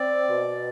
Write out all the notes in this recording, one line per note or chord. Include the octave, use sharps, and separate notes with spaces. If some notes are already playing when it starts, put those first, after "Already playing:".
Already playing: C4 D5
B2